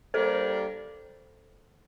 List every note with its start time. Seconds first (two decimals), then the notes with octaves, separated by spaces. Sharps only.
0.14 G3 A#3 D4 G4 A4 A#4 C5